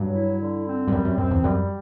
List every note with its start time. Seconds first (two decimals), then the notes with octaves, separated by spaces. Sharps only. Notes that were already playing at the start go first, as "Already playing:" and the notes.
Already playing: G2 F#3
0.14 E4
0.41 D3
0.66 C4
0.88 G2
0.92 F#2 G3
1.05 F#2
1.18 F#2 C4
1.31 E2
1.44 F#2 G3